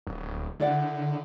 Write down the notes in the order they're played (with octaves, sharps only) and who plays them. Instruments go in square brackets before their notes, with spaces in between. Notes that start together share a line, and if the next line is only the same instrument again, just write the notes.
[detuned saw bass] D1
[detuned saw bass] D3 [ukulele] E4 D5 F#5